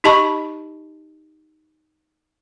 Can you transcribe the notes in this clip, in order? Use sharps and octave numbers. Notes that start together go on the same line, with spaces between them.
D#4 G4 D#5 A5 B5 C#6